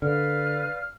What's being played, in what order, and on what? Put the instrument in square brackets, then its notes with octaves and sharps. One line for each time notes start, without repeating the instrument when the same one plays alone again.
[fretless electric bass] D3 [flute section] B4 D5 F5 [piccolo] F6